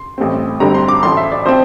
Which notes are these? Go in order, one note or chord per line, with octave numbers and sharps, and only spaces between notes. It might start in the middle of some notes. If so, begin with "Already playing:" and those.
Already playing: C6
A1 A2 G3 C4
G1 G2 D3 G3 C4 A#5
C6
D6
A1 A2 F3 C6
E5
D5
F3 C4 C5